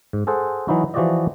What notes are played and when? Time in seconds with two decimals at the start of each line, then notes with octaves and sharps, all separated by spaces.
0.13 G#2
0.27 G#4 A4 C5 F#5
0.68 E3 F#3 D#4 E4 F#4
0.94 E3 F3 F#4 G4 D5 D#5